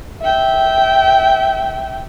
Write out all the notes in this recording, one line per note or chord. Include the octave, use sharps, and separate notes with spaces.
E5 G5